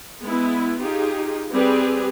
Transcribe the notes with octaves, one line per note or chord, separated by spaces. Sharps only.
G#3 B3 E4
D#4 F4 G4 G#4
G3 C4 G4 G#4 B4